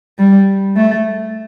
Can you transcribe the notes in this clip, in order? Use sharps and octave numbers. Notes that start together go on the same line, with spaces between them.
G3
A3